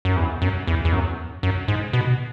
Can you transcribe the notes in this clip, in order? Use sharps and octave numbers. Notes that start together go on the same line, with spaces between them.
F#2
E2
F#2
E2
E2
F#2
F#2
G#2
B2